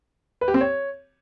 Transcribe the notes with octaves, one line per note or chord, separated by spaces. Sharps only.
B4
G4
C4
C#5